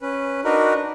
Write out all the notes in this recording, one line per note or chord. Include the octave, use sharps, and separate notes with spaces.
C#4 B4
D4 D#4 F#4 A#4 B4